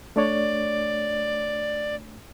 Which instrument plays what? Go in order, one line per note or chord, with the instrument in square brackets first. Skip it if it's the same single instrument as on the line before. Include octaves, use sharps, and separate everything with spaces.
[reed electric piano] A3 D4 C#5 [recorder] D5